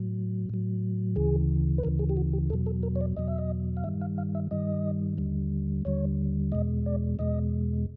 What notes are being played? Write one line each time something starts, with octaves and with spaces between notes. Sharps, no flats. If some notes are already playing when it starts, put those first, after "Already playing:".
Already playing: A2 F#3
A2 F#3
D2 C#3 E3 G#4
B4
D2 C#3 E3 A#4
G#4
G4
F#4
G4
E2 B2 F#3 A4
A4
A#4
C#5
D5
E2 B2 F#3 D#5
E5
D#5
F5
G2 D#3 G3 E5
F5
F5
E5
G2 D#3 G3 D#5
D#2 D3 G3
D#2 D3 G3 C#5
E2 B2 G#3 D#5
D5
E2 B2 G#3 D#5